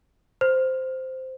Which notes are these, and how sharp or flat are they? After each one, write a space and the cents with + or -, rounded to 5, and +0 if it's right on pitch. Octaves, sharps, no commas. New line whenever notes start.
C5 -5